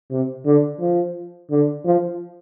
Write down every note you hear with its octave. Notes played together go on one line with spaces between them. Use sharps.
C3
D3
F3
D3
F3